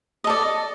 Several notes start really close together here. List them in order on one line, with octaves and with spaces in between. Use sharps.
D#5 A4 D5